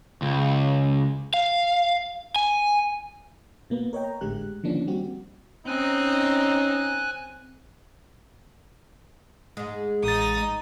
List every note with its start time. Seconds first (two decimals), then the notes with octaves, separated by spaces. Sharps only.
0.22 C#2
1.34 F5
2.36 G#5
3.70 B2 A#3 B3
3.93 A#4 C#5 D#5 G5
4.04 A#5
4.21 G#1 A2 D3 G#3 G4 F#6
4.64 D3 D#3 F3 A#3 C#4 D4
4.87 G3 C4 F#4 G4
5.67 C4 C#4 D#4 G#5 F#6
9.57 G#2 G#3
10.04 A1 D#4 D#6 A6